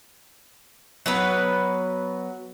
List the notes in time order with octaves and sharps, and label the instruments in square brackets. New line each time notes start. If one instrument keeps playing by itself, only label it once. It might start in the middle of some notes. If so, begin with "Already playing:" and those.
[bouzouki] F#3 B3 B4